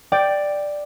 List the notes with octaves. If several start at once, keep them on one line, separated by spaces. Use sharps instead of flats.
D5 G5